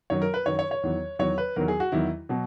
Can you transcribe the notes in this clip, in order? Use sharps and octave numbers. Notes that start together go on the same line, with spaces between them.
F#2 D#3 F#3 C#5
A#4
B4
F#2 D#3 F#3 C#5
C#5
C#5
E2 D#3 F#3
E2 D#3 F#3 C#5
B4
E2 D#3 F#3 A#4
G#4
F#4
E2 D#3 F#3 E4
B2 F#3